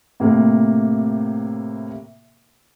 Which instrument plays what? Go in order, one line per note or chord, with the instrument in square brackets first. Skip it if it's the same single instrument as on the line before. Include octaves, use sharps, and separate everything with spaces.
[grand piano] A2 C3 A#3